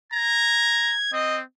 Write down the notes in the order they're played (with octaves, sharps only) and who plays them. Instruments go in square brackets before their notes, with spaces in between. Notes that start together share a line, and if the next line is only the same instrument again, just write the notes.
[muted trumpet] A#5 [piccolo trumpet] G#6
[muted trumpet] C4 [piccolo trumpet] D#5